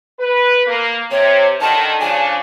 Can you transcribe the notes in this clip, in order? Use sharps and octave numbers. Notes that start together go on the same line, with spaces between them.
B4
A#3
C3 C#5
D3 D#3 A5
C#3 F3 D4 G#5